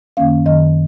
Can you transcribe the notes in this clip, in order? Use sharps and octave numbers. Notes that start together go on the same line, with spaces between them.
F#2 D#3 A#3 C#4 F5
F#2 D#3 F#3 D#5